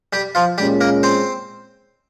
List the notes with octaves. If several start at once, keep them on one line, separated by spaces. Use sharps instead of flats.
G3 G4
F3 F4
A#2 G3 G#3 C#4 G4
A#3 A#4
C4 C5